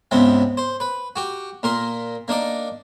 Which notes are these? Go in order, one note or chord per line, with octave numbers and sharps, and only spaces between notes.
C#2 G#2 C3 B3 C4
C5
B4
F#4 G4
A#2 A#4 C6
A#3 D4 D#4 D5